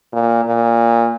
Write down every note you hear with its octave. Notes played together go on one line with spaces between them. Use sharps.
A#2
A#2